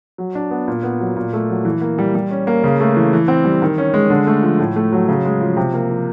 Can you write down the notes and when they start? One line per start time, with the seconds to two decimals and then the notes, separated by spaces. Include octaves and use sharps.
0.18 F#3
0.35 D4
0.51 B3
0.68 A#2
0.83 B3
1.01 F#3
1.16 A#2
1.33 A3
1.50 F#3
1.65 E3
1.81 A#3
1.98 G3
2.15 G3
2.31 C#4
2.47 A#3
2.64 C#3
2.80 A3
2.96 E3
3.13 E3
3.28 C4
3.44 G3
3.62 D#3
3.78 C#4
3.94 G#3
4.10 D3
4.27 A3
4.43 F3
4.60 A2
4.76 A3
4.92 F#3
5.09 C#3
5.25 G#3
5.41 F3
5.57 C3
5.74 A#3
5.90 F3